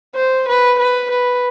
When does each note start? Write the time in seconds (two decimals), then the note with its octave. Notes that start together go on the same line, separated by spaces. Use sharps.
0.15 C5
0.48 B4
0.79 B4
1.11 B4